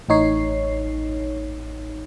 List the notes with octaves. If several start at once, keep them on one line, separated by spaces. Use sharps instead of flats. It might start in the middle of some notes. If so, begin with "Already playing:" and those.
A1 A2 D#4 C#5 C7